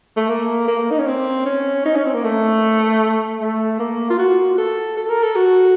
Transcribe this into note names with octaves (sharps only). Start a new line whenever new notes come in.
A3
A#3
A#3
D#4
C#4
C4
C#4
D#4
C#4
C4
A#3
A3
A3
A#3
F4
F#4
A4
A4
A#4
A4
F#4